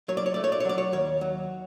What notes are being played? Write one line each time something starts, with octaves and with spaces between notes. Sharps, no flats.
F#3 C#5
D5
C#5
A3 D5
C#5
D5
C#5
F#3 D5
C#5
D#2 C#5
F#3